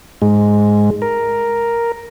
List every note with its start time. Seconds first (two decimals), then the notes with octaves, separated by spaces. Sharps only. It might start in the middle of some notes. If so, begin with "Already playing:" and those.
0.22 G#2 G#3
1.02 A#4